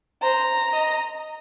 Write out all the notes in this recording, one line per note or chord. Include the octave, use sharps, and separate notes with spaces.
C5 A#5
D#5